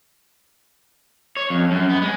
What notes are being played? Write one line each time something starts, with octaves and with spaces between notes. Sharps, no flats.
C#5
F2
F#2
B3
G#3